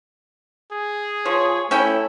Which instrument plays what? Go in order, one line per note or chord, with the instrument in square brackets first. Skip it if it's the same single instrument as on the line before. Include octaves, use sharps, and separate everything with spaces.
[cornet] G#4
[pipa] F3 [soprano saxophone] C#5
[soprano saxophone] A3 [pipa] C#4 E4 G5